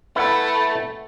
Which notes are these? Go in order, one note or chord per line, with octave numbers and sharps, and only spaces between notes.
A3 E4 B4 F#5